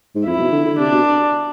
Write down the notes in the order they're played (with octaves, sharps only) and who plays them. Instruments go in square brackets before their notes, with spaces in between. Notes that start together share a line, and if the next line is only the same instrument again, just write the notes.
[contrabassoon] G#2
[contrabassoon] F2 [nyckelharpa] E4
[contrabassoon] B2
D3
D3
[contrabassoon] C3 [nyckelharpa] D4
[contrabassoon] B2